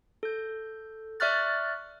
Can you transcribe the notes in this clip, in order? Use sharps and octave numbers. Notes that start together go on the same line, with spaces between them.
A4 G6
D5 E5 C#6 F6 F#6 A6